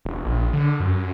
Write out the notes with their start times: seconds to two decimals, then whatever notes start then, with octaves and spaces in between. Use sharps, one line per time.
0.05 E1
0.24 A#1
0.53 D3
0.80 F#2